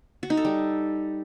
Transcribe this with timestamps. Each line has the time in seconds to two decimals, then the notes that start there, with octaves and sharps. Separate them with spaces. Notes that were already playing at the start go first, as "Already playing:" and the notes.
0.23 F#4
0.30 D#4
0.37 A4
0.45 G3